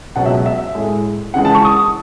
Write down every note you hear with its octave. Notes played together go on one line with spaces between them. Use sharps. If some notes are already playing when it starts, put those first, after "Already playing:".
C#2 B2 F#3 F#5
E5
E5
A2 G#3
C#2 C#3 E3 G#3 F#5
A5
C#6
D#6